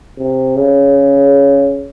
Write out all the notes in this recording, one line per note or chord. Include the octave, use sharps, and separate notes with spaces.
C3
C#3